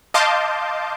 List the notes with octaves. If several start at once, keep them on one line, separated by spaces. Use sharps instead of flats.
D#5 F5 A5 C6 D6 G6